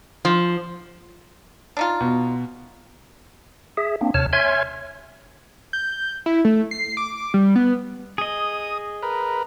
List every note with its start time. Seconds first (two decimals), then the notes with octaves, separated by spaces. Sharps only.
0.25 F3
1.77 D4 D#4 F4
2.01 B2
3.77 G#4 E5
4.01 A#3 C4 D4
4.14 D#2 C3 C#5 A5 F6
4.33 C#5 E5 G#5 C6 F6 G#6
5.73 G6
6.26 E4
6.45 A3
6.71 C7
6.97 D6
7.34 G3
7.56 B3
8.18 G#4 D#5 D#6
9.02 A#4 B4